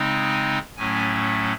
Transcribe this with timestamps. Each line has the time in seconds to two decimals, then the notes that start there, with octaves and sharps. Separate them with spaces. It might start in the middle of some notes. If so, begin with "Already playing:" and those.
Already playing: C#3 G#3 C4 D#4
0.30 G#5
0.77 A2 F#3 A3 C#4 G#5